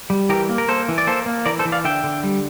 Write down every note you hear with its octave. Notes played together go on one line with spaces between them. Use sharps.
G3
E3 G4 A#4
A#3
A#4
A#3 A4 C5
E3
D5
A#3 A4 C5
A#3
E3 A#4 D5
A4 C5
E3
D5 F5
D3 E5 G5
D3
G3